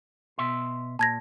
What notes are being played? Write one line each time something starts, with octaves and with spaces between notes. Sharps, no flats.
B2 E5 C6
A#2 A5 G#6 A#6